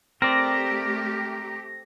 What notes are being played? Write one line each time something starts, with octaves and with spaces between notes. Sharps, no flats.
A3 C4 G4 A#4 D5 A#6